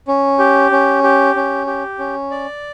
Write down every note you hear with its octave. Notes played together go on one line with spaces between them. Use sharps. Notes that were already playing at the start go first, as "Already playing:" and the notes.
C#4
G4
C#4
G4
C#4
G4
C#4
D5